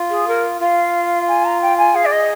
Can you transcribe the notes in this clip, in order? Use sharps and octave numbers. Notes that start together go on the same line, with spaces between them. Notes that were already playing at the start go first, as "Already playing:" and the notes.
Already playing: F4
G#4
A#4
F4 F5
G#5
A#5
G5
G#5
G#4 F5
D5
D#5